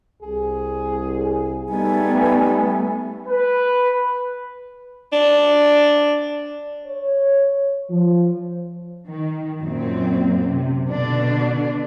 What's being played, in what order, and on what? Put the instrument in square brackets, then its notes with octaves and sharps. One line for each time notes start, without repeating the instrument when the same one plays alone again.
[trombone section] C2 [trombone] G#4
[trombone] G3 [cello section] A3 B3 [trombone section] D#4 [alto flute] G#5
[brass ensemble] B4
[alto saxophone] D4
[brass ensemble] C#5
F3
[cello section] D#3
F#2 A#2 C4
C3
B2 D3 D4